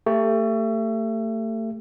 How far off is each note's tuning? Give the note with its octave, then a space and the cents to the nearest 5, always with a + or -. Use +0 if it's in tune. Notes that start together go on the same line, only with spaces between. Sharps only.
A3 +30 G4 +30